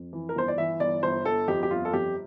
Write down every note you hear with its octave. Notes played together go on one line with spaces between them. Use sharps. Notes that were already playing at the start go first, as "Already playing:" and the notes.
Already playing: F2
E3
A#4
G1 C5
D5
E3 E5
G1 D5
G1 C5
G1 A4
F2 G4
G4
G1 F4
A4
F2 G4